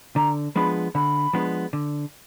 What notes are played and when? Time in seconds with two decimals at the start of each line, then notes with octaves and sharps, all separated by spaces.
0.16 D3 A#5
0.56 F3 G#3 B3 D4 B5
0.95 D3 B5
1.33 F3 G#3 B3 D4
1.73 D3